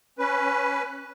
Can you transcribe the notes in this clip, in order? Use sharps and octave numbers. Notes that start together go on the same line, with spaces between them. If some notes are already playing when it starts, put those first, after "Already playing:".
C#4 B4